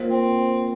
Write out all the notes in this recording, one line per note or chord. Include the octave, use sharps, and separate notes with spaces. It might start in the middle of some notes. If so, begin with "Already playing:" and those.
Already playing: A#3 F4 C5
C4